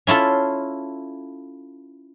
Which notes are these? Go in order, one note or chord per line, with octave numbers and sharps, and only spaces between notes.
C#4 E4 F4 A4